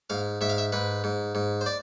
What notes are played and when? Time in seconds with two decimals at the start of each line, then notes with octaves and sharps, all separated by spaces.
0.10 G#2 F5
0.41 G#2 E5
0.50 F5
0.58 E5
0.72 G#2 B4
1.04 G#2
1.35 G#2
1.61 C5
1.66 D5